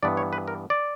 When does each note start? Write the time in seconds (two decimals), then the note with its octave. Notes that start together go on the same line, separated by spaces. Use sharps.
0.03 G2 E3 B3 D5
0.17 C#5
0.33 B4
0.48 A#4
0.70 D5